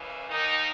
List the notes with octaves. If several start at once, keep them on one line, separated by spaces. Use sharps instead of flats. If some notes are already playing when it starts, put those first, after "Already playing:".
Already playing: D#2 C#3 E3
D#2 D#3 D#4